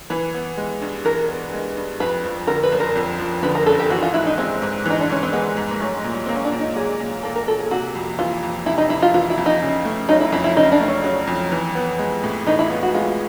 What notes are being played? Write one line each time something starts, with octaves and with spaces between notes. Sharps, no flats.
E3 B4
B3
G#3
G2
E3 A#4
B3
G#3
G2
F2 B4
F3
D3 A#4
B4
F#1
A#4
F2
F3
D3 B4
A#4
F#1 A4
G4
E3 F#4
F4
G#2 E4
D#4
G#3 C4
G#2
E3 D#4
D4
G#2 C#4
C4
G#3 B3
G#2
A#3
F#3 A3
G#3
A#2
G3
A#3 C4
C#4
D4
A#2
D#4
F#3 G#4
A#2
A#3 A4
A#4
A#2 A4
G#4
C3 F#4
F2
E3 F4
F2
C3 E4
D#4
F2 E4
F4
E3 F4
E4
F2
D#4
C#3
A3
F#3 D#4
E4
F2 E4
E4
C#3 D#4
D4
A3
C#4
F#3
F2
E3
B3
G#3
A2
E3 D#4
E4
B3 F4
F#4
G#3 F4